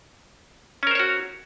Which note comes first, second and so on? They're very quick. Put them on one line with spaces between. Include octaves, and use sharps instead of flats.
C#4 A#4 C5 C#5 F#4